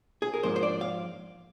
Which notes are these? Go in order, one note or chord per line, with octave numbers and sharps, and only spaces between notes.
G#4
A#4
G#2 F3 A#3 D4 C5
C5
D5
F5